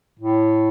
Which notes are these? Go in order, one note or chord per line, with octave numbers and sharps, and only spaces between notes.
A2